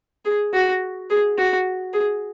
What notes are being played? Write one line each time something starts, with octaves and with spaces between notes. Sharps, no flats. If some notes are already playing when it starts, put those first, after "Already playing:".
G#4
F#4
G#4
F#4
G#4